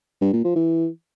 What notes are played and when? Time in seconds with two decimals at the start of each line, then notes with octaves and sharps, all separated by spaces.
0.21 G2
0.33 A#2
0.44 F3
0.56 E3